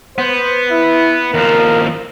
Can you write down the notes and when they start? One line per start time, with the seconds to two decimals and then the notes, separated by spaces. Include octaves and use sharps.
0.18 B3 C5
0.71 E4
1.34 D#2 F3 A#4